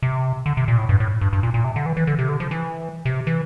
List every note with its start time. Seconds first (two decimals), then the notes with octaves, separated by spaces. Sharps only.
0.03 C3
0.46 D3
0.57 C3
0.68 A#2
0.78 A2
0.89 G2
1.00 A2
1.21 G2
1.33 G2
1.43 A#2
1.54 A#2
1.64 C3
1.76 D3
1.86 E3
1.97 E3
2.07 D3
2.19 C3
2.29 D3
2.40 F3
2.51 E3
3.05 C3
3.27 E3